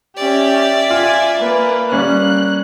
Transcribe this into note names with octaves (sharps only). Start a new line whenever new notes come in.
C#4 G4 D5 E5
F4 G#5
A#3 B4
G3 A#3 C#4 F#6